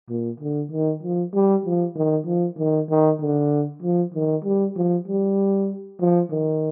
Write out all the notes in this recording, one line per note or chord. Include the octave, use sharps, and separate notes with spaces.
A#2
D3
D#3
F3
G3
F3
D#3
F3
D#3
D#3
D3
F3
D#3
G3
F3
G3
F3
D#3